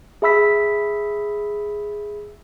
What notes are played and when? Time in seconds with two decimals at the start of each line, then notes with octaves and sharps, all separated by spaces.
0.22 G#4 E5 B5 E6 B6